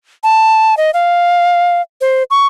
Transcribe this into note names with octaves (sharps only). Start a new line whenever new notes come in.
A5
D#5
F5
C5
C#6